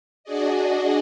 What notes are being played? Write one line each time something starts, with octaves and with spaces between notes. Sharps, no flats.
D4 F#4 G#4 D5 D#5